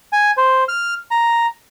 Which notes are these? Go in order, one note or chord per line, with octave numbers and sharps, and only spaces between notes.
G#5
C5
F6
A#5